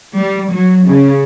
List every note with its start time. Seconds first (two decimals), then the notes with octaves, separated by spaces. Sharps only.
0.16 G3
0.52 F#3
0.87 C#3